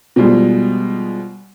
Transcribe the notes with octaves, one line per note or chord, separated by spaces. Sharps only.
B2 F3 G3 G#3